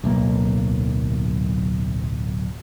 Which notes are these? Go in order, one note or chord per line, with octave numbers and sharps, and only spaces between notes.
D1 B1 A#3